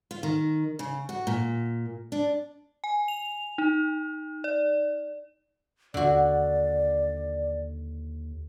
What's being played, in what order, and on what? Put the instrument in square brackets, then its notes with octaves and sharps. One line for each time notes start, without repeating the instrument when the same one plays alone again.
[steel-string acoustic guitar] F4
D#3
C#3
F#4
A#2
D4
[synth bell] G#5
F7
D#4
D5
[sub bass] D#2 [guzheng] D3 F#4 [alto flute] D5